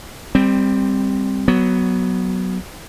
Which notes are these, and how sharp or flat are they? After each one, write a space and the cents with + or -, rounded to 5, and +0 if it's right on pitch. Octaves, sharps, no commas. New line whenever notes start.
G3 +15 C4 +0
F#3 +10 B3 +0